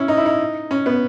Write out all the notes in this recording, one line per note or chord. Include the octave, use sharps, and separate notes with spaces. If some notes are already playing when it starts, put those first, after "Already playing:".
Already playing: C#4 E4
D#4
E4
D#4
C#4
B3